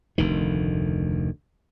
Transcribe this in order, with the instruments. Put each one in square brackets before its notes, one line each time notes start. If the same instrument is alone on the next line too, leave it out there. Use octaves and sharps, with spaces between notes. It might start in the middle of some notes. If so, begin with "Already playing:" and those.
[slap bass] F1 D2 D#3